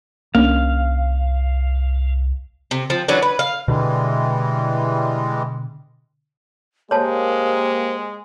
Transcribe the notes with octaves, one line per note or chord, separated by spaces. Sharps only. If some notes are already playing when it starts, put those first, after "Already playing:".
C2 A#3 C#4 D4 F5
C3
F3 C4
E3 F#3 C#4 D4
B4
F5
B2 D3 E3 G3 G#3
G#3 A#3 G4 C5 C#5 A5